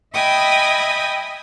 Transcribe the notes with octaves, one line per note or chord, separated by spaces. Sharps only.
D#5 E5 G5 G#5 B5 D#6